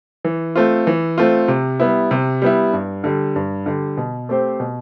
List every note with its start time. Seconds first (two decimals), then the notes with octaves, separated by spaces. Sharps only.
0.24 E3
0.56 A3 C4 F4
0.87 E3
1.18 A3 C4 F4
1.48 C3
1.80 G3 B3 E4
2.11 C3
2.42 G3 B3 E4
2.73 G2
3.04 D3 G3
3.36 G2
3.66 D3 G3
3.97 B2
4.29 A3 C4 G4 C5
4.60 B2